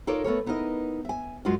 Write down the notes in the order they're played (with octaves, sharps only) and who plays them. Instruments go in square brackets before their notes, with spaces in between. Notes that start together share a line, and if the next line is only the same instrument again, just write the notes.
[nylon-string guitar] D#4 F4 A4 A#4 C#5 D5
A3 B3 A#4 C#5
B3 D#4 E4 A#4 D#5
E5 G#5
F#2 G#3 F4 F#4 A#4 D#5